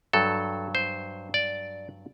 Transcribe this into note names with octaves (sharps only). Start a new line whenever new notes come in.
G2 F#3 A4
C5
D5